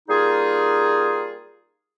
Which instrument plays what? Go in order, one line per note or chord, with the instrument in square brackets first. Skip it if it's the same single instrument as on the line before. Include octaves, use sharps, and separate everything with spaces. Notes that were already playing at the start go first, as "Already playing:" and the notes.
[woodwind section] G3 A#3 D#4 F4 G#4